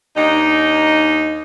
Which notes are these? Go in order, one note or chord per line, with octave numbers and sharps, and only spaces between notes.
D#2 D4 D#4